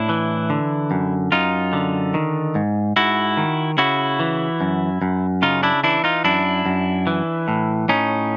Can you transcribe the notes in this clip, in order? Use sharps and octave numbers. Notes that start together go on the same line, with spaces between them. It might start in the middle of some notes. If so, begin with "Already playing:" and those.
Already playing: A2 D4 E4
E3
D3
F#2
F#2 D#4 F4
D3
D#3
G#2
G#2 E4 F#4
D#3
C#3 E4 F#4
E3
F#2
F#2
C#3 D#4 F4
D4 E4
E3 D4 E4
D#4 F4
F#2 D4 E4
F#2
E3
A2
A2 C#4 D#4